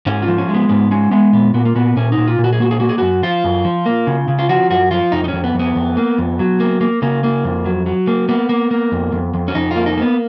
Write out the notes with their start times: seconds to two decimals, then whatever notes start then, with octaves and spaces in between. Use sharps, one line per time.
0.06 G#2 C#4
0.22 F4
0.28 F3
0.38 C#4
0.49 G#3
0.54 B3
0.69 G#2 B3
0.91 G#3 C#4
1.11 G#3 B3
1.33 A#2 B3
1.54 A#2 B3
1.65 A#3
1.75 A#2 B3
1.96 A#2 C#4
2.12 D#4
2.18 A#2
2.28 F4
2.39 A#2
2.44 F#4
2.53 G#4
2.60 A#3 F#4
2.71 G#4
2.80 A#3 F#4
2.89 G#4
2.98 F#2 F#4
3.23 F3 F4
3.44 F#2
3.65 F3
3.86 A#3
4.07 C#3
4.28 C#3
4.39 F4
4.49 F3 F#4
4.70 F#2 F#4
4.91 F3 F4
5.12 F2 D#4
5.24 D#4
5.28 F2 C#4
5.44 B3
5.55 F2 B3
5.76 F2
5.97 A#3
6.18 F2
6.39 F#3
6.60 A#3
6.81 A#3
7.02 C#3 A#3
7.24 A#3
7.44 F2
7.65 F#3
7.86 F#3
8.07 A#3
8.29 A#3 B3
8.49 A#3
8.71 A#3
8.92 F2
9.13 F2
9.34 F2
9.48 C#4
9.55 F2 D#4
9.71 F4
9.76 A#3
9.86 D#4
9.97 A#3 B3